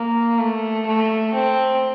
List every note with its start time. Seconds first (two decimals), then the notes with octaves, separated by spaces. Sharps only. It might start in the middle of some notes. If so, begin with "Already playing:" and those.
Already playing: A#3
0.40 A3
0.86 A3
1.34 C4